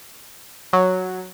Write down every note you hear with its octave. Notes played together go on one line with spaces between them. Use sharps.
F#3